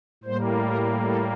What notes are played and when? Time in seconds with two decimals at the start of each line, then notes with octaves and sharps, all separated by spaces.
0.24 A2 G3 A#3 C5
0.65 A#4
1.04 A4